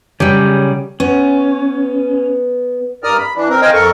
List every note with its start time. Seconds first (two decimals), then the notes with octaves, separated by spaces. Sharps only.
0.20 C#3 F#3 G3 G4 G#4
1.00 B3 C#4
3.04 G2 A#4 D5 A#5 D#6 F6
3.18 B5
3.36 E3 D4
3.49 C4 A#4
3.62 C5 D#5 F5 G5 G#5
3.74 F2 A4 A#4 C#6